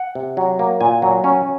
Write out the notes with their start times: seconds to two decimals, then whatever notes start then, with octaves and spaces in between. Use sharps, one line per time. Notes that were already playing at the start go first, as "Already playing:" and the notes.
Already playing: F#5
0.15 C3
0.37 F#3
0.59 A#3
0.81 A#2 G#5
1.02 F#3
1.24 C#4